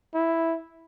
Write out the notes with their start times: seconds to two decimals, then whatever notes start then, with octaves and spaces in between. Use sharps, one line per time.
0.15 E4